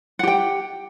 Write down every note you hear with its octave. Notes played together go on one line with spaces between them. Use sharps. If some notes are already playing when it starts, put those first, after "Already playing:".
G4 F#5 G5